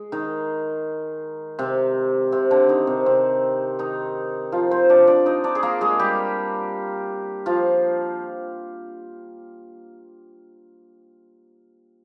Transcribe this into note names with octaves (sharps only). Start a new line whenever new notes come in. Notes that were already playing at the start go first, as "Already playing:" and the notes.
Already playing: G#3 G#4
D#3 D#4
C3 C4
C3 C4
D3 D4
D#3 D#4
C3 C4
C3 C4
D#3 D#4
F3 F4
C4 C5
D4 D5
D4 D5
D#4 D#5
D4 D5
G#4
A#3 A#4
G#3 G#4
G3 G4
F3 F4